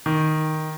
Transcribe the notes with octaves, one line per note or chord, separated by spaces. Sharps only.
D#3